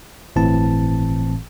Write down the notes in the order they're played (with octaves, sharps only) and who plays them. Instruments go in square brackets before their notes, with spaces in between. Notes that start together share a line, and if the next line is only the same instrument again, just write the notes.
[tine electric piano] G1 A2 E3 C4 A5